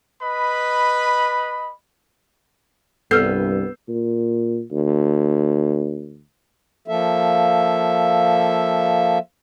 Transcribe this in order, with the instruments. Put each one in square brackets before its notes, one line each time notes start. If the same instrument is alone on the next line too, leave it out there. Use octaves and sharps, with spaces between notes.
[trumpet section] B4 D#5 B5
[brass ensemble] C2 G2 [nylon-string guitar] B3 [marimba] A4 F6 [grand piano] E6 G6 C7
[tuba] A#2
D2
[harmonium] F3 A#3 A4 E5